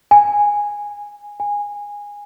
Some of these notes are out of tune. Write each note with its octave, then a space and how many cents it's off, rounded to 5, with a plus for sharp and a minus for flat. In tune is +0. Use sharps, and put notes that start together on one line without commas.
G#5 -10
G#5 -15